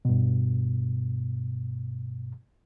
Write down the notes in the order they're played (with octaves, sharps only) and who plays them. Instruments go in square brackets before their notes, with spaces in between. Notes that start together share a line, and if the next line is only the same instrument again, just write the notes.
[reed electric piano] G2 B2